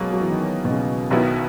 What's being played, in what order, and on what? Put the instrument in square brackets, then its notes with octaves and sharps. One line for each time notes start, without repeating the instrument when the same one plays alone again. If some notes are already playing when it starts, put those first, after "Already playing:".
Already playing: [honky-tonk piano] B2 A#3 C#4 [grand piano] F#3 G#3
[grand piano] F#3
E3
D#3
B2
C#3
[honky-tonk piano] B1 B2 F#3 B3 E4 [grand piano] D#3